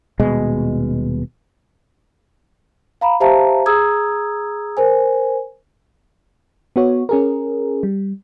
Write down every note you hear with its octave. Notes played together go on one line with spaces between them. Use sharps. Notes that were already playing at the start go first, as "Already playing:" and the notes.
D#1 B2 G#3
F5 A#5 B5
G4 C5 E5 F5 A5 A#5
G#4 A#5 D#6 E6 G#6
A#4 C5 G#5
B3 F#4 C#5
C#4 G#4 A#4
G3